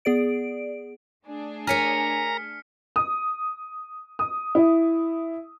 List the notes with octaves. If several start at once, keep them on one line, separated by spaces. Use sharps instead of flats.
B3 G#4 D5 D7
A3 D4 G#4
A#4 C#5 G#5 A#5 F6 B6 C#7
D#6
D#6
E4